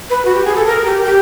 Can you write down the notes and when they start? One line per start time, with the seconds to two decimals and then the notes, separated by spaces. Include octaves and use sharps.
0.10 B4
0.25 F#4
0.35 G4
0.45 G#4
0.55 A4
0.67 A#4
0.86 G4
1.05 G4